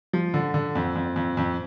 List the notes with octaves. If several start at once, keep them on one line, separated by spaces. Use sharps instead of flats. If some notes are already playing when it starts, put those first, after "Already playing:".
F3
D3
D3
F2
F2
F2
F2